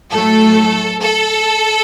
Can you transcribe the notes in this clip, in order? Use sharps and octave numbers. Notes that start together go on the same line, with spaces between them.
A2 F#3 A3 A4
A4